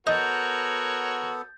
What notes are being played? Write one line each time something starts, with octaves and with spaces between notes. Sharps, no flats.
B3 F#4 A4 A#4 C#5 D#5 G6 A6